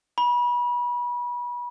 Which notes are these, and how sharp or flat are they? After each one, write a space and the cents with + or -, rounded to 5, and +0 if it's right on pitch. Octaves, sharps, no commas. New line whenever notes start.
B5 -30